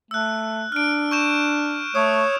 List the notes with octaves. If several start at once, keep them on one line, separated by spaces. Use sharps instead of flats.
A3 E6 F#6
D4 F6 D7
C#6 G6 E7
A3 C#5 D#6